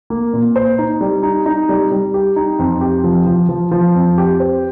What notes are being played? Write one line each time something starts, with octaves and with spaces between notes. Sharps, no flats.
A#3
A#2
C5
D#4
G3
D#4
D#4
G3
G3
G4
D#4
F2
G4
F3
F3
F3
F3
F2
G4
C5